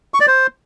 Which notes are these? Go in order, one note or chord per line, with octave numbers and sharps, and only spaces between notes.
C#6
D5
C5